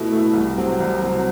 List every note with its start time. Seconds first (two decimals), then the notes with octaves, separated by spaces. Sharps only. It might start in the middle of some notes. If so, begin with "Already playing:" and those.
Already playing: B2 A3 E4
0.12 A3 E4
0.34 C2
0.57 C3 F#3 C4
0.80 C2
1.03 C3 F#3 C4